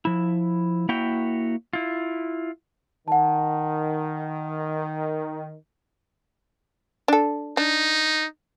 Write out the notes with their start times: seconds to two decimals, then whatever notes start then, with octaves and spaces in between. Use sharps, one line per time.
0.05 F3 E4
0.89 A#3 E4 F#4 C#5 E5 G5
1.73 E4 F4
3.08 D#3 F#5 A5
7.08 D4 A4
7.57 D4 D#4